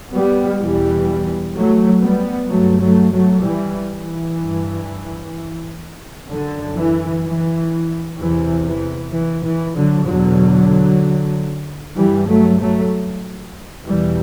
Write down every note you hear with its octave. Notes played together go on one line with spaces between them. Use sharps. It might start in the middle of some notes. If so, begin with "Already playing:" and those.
G3 B3
E2 B2 E3 G3
F#3 A3
G3 B3
G2 F#3 A3
F#3 A3
F#3 A3
E3 G3
E3
G2
F#2 D3
E3
E3
E2 C3 E3
E3
E3
E3
D3 F#3
E2 B2 D3 F#3
G2 E3 G3
F#3 A3
F#3 A3
E2 B2 E3 G3